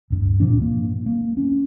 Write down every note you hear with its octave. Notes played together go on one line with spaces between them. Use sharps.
D1 G2
A#2 F3 D4
A#3
A#3
C#4